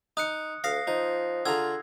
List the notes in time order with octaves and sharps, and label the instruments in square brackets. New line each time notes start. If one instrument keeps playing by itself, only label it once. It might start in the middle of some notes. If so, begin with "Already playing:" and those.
[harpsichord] D#4 [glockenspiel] D#6 F#6 C#7
[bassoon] D2 [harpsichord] F5 [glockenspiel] D#6 A#6 C7
[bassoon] F3 [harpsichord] D#4
[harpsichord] D3 G#4 A#5 [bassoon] F4 [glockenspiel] E6 G#6